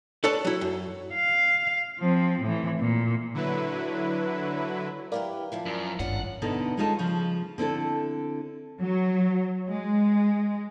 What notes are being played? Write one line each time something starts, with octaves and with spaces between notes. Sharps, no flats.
A4 B4 C#5 D5 A5
F#3 E4
F#2
F5
F3 C4
A2 E3
A#2
D3 F#3 E4 B4
E4 G4 A#4 B4 D5 F5
A#2 F3 E4
F#2
G#1 G2 C#4 D4 F4 F#5
B2 D3 D#4 E4 A4
G#3 C#4 D#4 F4 F#4 A4
C#3 F3
D3 C4 E4 A4
F#3
G#3